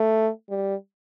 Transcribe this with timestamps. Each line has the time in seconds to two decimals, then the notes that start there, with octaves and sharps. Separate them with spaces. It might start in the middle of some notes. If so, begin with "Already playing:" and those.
Already playing: A3
0.50 G3